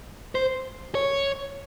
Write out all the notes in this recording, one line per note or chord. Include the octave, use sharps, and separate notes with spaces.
C5
C#5